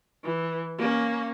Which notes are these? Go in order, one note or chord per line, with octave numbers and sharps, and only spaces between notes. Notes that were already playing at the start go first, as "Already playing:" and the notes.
E3
A#3 C#4